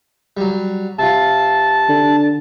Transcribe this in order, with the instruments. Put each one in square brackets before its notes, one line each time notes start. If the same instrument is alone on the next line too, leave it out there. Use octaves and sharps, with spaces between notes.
[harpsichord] F#3 G3
[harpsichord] C3 F4 [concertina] A5
[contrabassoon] D3